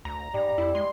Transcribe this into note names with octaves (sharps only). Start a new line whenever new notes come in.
D2 A#5
G#2 G3
F2 E4
G#3 C6